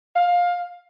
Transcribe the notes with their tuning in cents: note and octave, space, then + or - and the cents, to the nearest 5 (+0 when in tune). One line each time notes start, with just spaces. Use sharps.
F5 +15